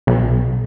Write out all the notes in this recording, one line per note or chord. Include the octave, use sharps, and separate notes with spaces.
B1